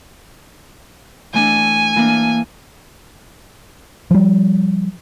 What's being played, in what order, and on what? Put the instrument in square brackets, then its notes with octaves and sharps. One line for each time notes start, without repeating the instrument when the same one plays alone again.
[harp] E3 A3 D4 [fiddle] G#5
[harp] E3 A#3 D4
[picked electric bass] F3 G3